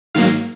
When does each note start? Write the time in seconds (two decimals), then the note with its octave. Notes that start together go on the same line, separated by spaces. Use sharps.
0.15 G#2 D#3 F#3 A#3 F5